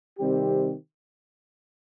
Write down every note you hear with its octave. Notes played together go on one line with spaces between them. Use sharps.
C3 D#3 G3 C4 G4